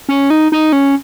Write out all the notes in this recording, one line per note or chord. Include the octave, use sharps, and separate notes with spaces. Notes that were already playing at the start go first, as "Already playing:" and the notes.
C#4
D#4
D#4
C#4